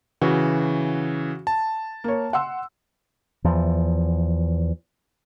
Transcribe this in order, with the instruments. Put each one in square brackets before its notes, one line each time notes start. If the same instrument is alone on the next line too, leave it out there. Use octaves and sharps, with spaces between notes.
[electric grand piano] C#3 E3 [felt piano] F#4
[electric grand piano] A5
[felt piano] A#3 C#5
F#5 C6 E6
[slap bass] E2 F3